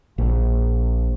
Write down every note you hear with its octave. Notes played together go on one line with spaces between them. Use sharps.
A#1